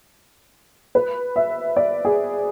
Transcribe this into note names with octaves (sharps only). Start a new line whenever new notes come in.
B4
E5
D5
G#4